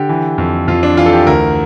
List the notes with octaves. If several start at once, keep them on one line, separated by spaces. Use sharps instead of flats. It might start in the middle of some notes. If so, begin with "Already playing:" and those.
Already playing: D3 G4
E3
F2
F2 F4
D4
E3 F4
A4
G4
D2 A#4